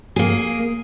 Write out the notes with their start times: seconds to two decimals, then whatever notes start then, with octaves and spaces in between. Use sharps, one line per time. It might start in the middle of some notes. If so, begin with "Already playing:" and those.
0.16 A#3 G#4